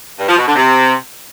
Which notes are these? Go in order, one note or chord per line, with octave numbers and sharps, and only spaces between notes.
G2
F3
B2
D3
C3